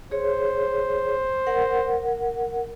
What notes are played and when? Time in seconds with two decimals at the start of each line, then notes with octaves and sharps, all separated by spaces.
0.11 G#4 C5 C#5
1.47 A#4 F#5